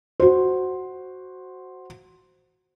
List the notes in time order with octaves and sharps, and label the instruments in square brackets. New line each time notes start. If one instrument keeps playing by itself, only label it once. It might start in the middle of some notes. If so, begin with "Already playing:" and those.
[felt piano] F#4 C5